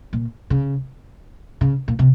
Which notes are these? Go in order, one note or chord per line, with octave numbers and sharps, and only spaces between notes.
A#2
C#3
C#3
A#2
C3